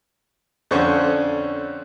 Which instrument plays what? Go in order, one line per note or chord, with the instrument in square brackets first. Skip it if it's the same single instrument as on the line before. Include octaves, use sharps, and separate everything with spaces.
[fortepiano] F2 D3 C#4 D4 C5 C#6